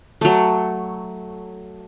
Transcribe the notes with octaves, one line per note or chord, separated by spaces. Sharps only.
F#3 A3